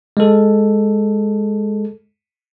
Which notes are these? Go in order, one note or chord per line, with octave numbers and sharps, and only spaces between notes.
G#3 A4